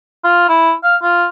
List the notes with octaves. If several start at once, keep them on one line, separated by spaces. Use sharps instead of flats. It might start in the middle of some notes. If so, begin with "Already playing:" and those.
F4
E4
F5
F4